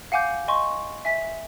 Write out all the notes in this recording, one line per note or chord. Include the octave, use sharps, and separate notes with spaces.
F5 F#5 G#5 D6 G6
D#5 G#5 C6 C#6
E5 G#5 B6